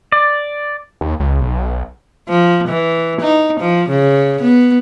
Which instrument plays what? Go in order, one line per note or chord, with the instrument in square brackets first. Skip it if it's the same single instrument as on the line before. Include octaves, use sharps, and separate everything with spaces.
[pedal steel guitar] D5
[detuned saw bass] D#2
C#2
B1
[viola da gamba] F3
E3
D#4
F3
C#3
B3